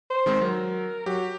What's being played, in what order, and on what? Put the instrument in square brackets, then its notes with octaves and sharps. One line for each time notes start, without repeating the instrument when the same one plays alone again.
[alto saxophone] C5
[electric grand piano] D#3 G#3 C4
[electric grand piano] F#3 [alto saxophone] A#4
[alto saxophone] F#3 [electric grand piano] G4